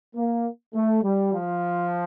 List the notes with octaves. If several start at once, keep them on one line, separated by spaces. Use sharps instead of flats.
A#3
A3
G3
F3